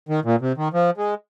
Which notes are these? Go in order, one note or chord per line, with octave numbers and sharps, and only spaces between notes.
D#3
A#2
C3
D#3
F3
G#3